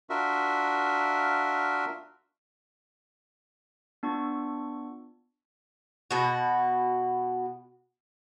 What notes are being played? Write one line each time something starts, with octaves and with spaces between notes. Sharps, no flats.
D4 F4 F#4 A#4 E5
B3 D4 F4 C#6
B2 F#4